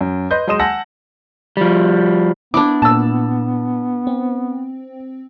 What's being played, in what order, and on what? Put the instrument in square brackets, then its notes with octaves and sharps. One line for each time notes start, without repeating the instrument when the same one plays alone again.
[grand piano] F#2
B4 D#5 C6 G6
F#3 G#3 D#5 C6 D#6 E7
F#5 G#5 A5 E6 A#6
[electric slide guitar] F3 G3
[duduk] B3 [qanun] D4 E4 [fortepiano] D6
[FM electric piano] A#2 [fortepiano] A5 E6
[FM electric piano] C4